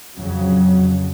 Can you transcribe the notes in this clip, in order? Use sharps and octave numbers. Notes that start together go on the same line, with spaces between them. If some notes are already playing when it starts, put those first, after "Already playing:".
F2 C#3 F#3